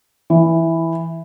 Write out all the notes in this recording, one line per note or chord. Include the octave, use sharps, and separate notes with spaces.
E3